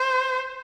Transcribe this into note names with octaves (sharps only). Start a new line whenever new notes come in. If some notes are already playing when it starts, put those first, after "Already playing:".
Already playing: C5